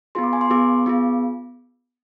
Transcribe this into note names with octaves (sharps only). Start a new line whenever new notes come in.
B3 F4 G#4 C6
D6
G#5
C6
B3 F4 G#4 D6
B3 F4 G#4